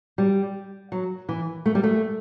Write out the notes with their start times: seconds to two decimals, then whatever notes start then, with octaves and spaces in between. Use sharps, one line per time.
0.18 G3
0.92 F#3
1.29 E3
1.66 A3
1.75 G3
1.84 A3